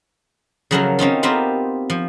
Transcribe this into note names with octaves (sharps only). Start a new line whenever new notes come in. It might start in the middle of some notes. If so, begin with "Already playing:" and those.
C#3 F3 F#3 C#4 E4 A#4
C4 C#4 D#4 F4
B3 C4 F4 G4 A#4
F3